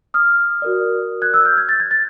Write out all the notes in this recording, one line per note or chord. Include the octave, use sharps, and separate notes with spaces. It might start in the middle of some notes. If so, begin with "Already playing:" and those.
D#6 F6
F#4 A#4 D5
F#6 G#6
E6 F#6
F6 G6
G#6
A6
G#6
A6